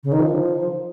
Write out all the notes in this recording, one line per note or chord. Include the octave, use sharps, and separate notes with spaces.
C#3
D#3
F3